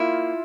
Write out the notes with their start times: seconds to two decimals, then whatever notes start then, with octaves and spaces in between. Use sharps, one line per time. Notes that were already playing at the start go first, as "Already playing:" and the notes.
Already playing: A#3 E4 F4